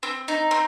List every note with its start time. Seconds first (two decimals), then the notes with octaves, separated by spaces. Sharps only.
0.03 C4
0.28 D#4
0.51 C4